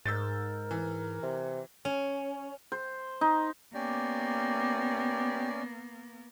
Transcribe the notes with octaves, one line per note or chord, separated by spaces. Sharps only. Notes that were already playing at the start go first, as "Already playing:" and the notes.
G#2 A#4 E6 G6 A6
E3
C3
C#4
C5
D#4
A#3 B3 C#4 G4 D5